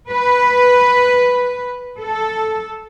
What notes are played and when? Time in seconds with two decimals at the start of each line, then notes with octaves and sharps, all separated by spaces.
0.10 B4
2.00 A4